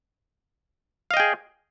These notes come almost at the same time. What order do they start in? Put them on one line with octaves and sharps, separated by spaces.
F5 D#5 G5 G#4